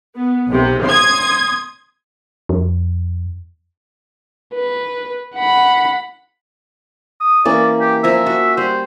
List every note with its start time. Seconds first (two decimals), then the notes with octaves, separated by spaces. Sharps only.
0.17 B3
0.50 B1 C3
0.86 C6 D#6 G#6
2.49 F2
4.55 B4
5.35 F#5 B5
7.20 D#6
7.45 E3 A#3 C#4 D5
7.81 G4
8.04 F3 E5 G#5 A#5
8.26 F#4
8.57 G3 C5